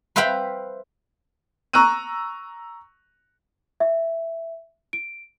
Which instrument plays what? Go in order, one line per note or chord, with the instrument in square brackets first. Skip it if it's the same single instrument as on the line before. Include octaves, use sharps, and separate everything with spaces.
[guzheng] B4 C5 E5 F5 G5 B5
[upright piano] A#5 C#6 E6 F#6 D#7
[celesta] E5
D7